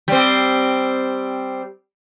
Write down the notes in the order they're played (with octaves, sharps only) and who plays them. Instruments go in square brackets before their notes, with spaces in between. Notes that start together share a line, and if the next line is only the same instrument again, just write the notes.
[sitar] G3 C4